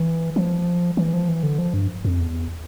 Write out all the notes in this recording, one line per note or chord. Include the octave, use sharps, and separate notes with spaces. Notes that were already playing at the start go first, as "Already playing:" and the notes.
Already playing: E3
F3
E3
F3
E3
D3
F3
G2
F2
E2